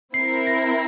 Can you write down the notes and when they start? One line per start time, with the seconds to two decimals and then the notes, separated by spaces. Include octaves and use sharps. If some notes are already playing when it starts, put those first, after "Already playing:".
0.14 C4 E4 A#4 C7
0.47 A#6